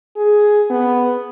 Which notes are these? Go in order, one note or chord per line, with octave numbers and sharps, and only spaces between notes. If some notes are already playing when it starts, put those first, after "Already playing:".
G#4
B3